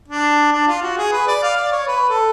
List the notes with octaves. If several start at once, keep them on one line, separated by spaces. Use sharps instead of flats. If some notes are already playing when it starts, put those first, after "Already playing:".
D4
D4
F4
F#4
G#4
B4
D5
F5
D5
C#5
B4
A4